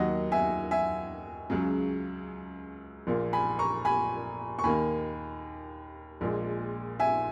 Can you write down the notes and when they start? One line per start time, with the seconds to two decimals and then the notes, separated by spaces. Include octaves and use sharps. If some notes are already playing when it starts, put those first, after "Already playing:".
Already playing: D#2 D#3 F#3 D#5 F#5
0.32 E5 G#5
0.71 E5 G#5
1.50 C#2 C#3 F#3
3.07 A#1 A#2 A#3
3.33 G#5 B5
3.59 A#5 C#6
3.85 G#5 B5
4.59 C#6
4.64 D#2 D#3 A#3 G#5 B5
6.21 A#1 A#2 G#3
7.00 E5 G#5